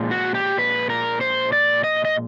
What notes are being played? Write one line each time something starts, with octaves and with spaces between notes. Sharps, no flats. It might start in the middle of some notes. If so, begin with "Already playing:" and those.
Already playing: A#2 F3 G#3
F#4
G4
B4
A#4
C5
D5
D#5
D#5